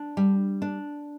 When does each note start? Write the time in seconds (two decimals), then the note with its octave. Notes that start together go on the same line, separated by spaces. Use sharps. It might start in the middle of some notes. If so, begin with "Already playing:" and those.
Already playing: D4
0.17 G3
0.62 D4